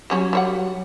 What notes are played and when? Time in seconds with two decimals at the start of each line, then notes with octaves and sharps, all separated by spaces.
0.10 F#3 G3 C#4 F#4
0.33 G3 C#5 F#5